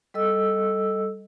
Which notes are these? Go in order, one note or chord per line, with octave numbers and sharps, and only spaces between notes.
G3 A4 D#5 E6